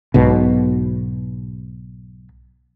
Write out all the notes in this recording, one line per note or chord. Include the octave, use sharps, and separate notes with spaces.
B1 G#2 B2